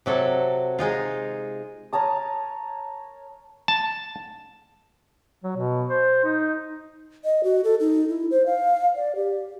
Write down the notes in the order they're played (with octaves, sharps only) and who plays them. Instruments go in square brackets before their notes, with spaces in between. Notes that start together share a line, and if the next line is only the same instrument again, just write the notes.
[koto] C3 F#3 A4
G#3 D#4 F4
[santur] A#4 C#5 A5 D#6
[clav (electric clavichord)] A5
[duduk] F#3
B2
C5
D#4
[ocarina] D#5
F#4
A4
D#4
E4
C5
F5
D5
G4